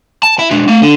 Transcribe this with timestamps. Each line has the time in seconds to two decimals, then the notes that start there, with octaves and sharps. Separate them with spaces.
0.23 A5
0.39 E4
0.51 G#3 D4
0.68 A3 F5
0.82 D3